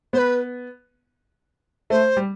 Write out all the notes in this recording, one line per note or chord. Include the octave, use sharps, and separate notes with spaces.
B3 C5
B4
A3 C5
G3